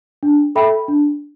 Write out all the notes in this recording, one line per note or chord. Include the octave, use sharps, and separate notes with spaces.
D4
A4 E5 G5 B5
D4